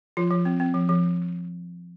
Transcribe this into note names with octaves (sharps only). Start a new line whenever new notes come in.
F3 F4
F3
C4
C4
F3
F3